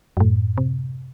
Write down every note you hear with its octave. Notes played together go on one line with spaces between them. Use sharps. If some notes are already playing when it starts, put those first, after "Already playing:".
F#2 A2
C3